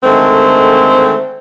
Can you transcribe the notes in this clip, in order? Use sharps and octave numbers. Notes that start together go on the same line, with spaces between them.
D3 D#3 G#3 A3 C4